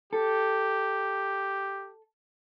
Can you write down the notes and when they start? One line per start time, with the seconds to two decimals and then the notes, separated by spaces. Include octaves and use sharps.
0.13 G4 A4